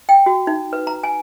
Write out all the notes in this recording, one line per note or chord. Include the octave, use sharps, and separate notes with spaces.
G5
F#4
D#4
B4
A#5
G#5